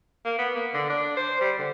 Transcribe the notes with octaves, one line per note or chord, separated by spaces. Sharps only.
A#3
B3
A#3
D3
D4
C5
G3
D3